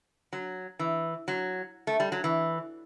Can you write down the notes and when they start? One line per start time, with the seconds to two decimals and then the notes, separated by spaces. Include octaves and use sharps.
0.33 F#3
0.79 E3
1.28 F#3
1.87 A3
2.00 G3
2.12 F#3
2.24 E3